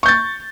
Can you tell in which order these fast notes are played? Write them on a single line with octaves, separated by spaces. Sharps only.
C#6 G6 A6